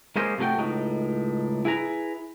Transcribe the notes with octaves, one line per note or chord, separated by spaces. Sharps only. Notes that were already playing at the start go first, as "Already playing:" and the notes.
G#3 A#3 C#4 C5 D#5
C3 F3 A3 F#4 G5
C#2 A2 D#4
E4 G#4 B4 A#5